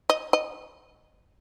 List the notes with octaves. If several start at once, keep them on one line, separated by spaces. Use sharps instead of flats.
D#5
D#5